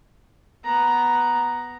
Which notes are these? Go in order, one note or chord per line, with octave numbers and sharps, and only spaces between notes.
B3 A#5